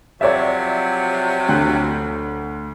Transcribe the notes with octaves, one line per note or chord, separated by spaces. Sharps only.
C3 F3 F#3 C#5 D5 E5
D2 F#6